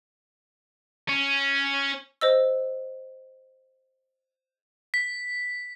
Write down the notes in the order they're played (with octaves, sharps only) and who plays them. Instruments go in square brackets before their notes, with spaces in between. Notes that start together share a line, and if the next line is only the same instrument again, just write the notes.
[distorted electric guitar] C#4
[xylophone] C5 D#5 E6
[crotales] B6